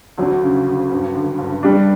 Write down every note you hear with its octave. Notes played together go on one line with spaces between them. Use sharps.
D2 F#3
C#3
D2
G2
D3
G2
G3 D4